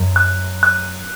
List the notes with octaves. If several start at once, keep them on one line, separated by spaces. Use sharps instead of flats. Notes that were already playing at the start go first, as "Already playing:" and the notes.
Already playing: F#2
F#6
F#6